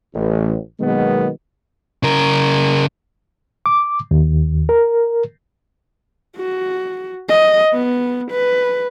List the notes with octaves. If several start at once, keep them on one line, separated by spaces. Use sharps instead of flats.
A1
B2 D#3 F#3 G#3 A#3 B3
C#3 A#4
D6
D#2
A#4
F#4
D#5
B3
B4